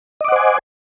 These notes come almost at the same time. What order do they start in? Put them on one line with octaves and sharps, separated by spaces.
D#5 D6 F#5 C5 G#5